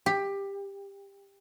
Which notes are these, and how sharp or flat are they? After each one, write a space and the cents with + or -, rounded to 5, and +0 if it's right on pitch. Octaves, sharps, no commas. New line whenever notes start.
G4 +15